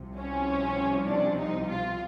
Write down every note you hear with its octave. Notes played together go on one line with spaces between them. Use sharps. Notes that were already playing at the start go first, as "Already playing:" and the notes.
Already playing: C2 C3 F3
C#4
D4
D#4
F4